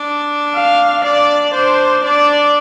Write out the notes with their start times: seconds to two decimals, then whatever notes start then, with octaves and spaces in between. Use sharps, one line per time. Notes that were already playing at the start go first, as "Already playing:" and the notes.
Already playing: D4
0.55 F5
1.05 D4 D5
1.54 D4 C5
2.04 D4 D5